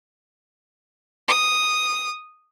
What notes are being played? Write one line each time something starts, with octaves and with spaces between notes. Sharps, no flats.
D#6